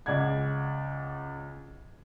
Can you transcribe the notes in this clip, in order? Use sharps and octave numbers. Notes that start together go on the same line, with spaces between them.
C#2 D5 F#5 G#6